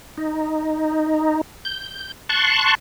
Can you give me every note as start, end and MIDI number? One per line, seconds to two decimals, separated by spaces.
0.18 1.41 63
1.65 2.12 91
2.29 2.75 81
2.29 2.75 84
2.29 2.75 85
2.29 2.75 90